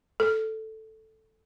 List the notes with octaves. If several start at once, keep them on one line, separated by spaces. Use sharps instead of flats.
A4